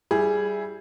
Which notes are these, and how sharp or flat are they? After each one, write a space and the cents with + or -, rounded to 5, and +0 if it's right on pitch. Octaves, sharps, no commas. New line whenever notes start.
G3 -10 E4 +0 G#4 +0